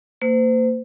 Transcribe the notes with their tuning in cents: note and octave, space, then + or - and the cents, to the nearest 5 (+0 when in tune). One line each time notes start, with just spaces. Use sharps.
A#3 -30 C5 -35